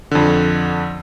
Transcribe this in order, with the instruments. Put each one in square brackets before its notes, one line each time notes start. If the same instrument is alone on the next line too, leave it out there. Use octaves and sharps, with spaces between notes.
[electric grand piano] F2 D3